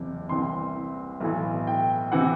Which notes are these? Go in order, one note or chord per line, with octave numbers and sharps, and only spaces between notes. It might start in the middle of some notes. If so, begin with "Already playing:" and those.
Already playing: F#1 E2 C3
C2 C3 E3 C6
B1 A2 E3
G5
C3 E3 F#5